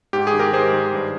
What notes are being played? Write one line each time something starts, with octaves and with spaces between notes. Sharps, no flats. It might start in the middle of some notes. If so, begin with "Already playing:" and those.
G#2 G4
G#4
D#3
G4 A#4
G#2 G#4 C5
D#3
G2